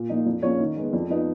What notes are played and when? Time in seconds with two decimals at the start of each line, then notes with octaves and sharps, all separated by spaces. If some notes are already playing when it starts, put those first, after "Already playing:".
Already playing: A#2
0.10 F3 A#3 D#4
0.26 F2
0.43 F3 A#3 C#4 C#5
0.60 D#3
0.76 G#3 B3
0.93 F2
1.10 F3 B3 D#4